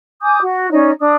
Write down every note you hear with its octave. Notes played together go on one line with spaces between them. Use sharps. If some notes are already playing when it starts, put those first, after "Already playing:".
G#5 D6 D#6 G6
F#4
C#4 D#4 C#5 D5
D4 D#6